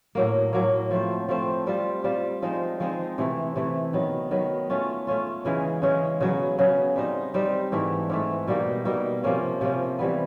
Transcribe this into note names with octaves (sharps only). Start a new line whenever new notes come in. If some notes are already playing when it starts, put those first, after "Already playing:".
A2 F#3 A#3
A2 F#3 A#3
F3 A3 C4
F3 A3 C4
G3 C4 F4
G3 C4 F4
F3 G#3 C4 D#4
F3 G#3 C4 D#4
C3 E3 A3
C3 E3 A3
D#3 F#3 B3
D#3 F#3 B3
A3 C#4 F4
A3 C#4 F4
C#3 E3 G#3 C#4
C#3 E3 G#3 C#4
C#3 F#3 B3
C#3 F#3 B3
G3 C4 D#4
G3 C4 D#4
G#2 E3 A3
G#2 E3 A3
B2 G3 A#3 D#4
B2 G3 A#3 D#4
C3 F3 A#3 C#4
C3 F3 A#3 C#4
C3 E3 G3 B3